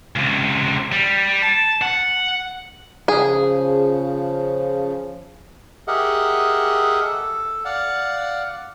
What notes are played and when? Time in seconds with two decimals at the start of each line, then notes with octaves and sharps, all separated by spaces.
0.16 C#2 C3
0.92 G3
1.42 A5
1.82 F#5
3.08 C#3 F3 G#4
5.88 G4 G#4 A#4 D#5 E5 F#5
7.02 A4
7.65 D5 F5 F#5